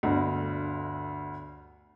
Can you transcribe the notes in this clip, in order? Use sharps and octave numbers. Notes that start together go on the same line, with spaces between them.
G1 D2